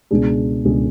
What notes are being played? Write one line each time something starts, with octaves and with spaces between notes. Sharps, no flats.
C#2 B2 G#3 D4 G#4
C#2 B2 G#3 D4 G#4